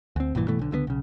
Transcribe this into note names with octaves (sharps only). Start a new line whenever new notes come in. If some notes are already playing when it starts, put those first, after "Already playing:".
D2 C4
A#1 G2 A#2 E3
G2 B2 E3 A3
B1 D3
C#2 D3 F#3 B3
B1 C#3